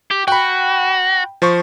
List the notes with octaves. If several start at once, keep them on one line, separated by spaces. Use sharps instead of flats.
G4
F#4 G5 B5
F3 C5 C#6